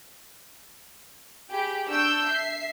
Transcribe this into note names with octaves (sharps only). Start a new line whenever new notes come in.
G4 G#4 B5 D7
D4 C#6 E6 G6 D7
E5 C7